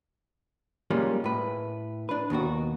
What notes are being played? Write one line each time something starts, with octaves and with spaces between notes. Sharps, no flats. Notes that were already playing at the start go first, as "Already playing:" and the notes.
G3 G#3 A#3 C#4 F4
A2 B4
D4 B4
D#2 B2 D#3 F#4